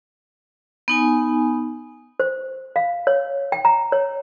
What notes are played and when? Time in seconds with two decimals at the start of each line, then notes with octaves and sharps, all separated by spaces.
0.88 B3 D#4 G#5
2.20 C5
2.76 F5
3.07 C#5
3.52 G5
3.65 A#5
3.92 C#5